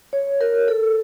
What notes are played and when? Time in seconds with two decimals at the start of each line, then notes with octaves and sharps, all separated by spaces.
0.13 C#5
0.41 A#4
0.54 A#4
0.68 A4